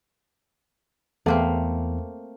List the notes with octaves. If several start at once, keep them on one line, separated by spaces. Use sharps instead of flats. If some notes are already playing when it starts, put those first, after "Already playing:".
E2 A3 A#3 C4